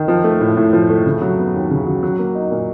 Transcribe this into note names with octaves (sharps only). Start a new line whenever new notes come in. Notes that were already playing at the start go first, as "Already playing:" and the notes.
Already playing: D#3
F3
A3
A2
A2
F3
A3
C#3
F#3
B3
D#2
C#3
F#3
F#3
A#3
D#4
A#2